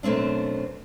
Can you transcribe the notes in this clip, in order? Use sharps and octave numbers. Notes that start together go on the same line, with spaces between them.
F#2 B2 A3 C4 D4